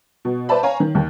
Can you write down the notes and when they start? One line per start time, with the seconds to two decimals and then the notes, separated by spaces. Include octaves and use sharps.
0.25 B2
0.49 B4 C5 D5 E5 A5 B5
0.63 C#5 F5 G#5 A#5
0.80 D#3
0.95 D#2